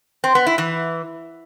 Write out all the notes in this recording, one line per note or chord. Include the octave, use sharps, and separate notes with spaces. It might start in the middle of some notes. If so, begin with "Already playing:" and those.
C4
B3
E4
E3